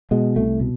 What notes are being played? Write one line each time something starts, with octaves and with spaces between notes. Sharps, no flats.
B2 G#3
C2 A3
B2